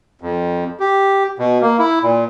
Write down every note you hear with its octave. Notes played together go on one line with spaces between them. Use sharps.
F2
G4
B2
A#3
E4
A#2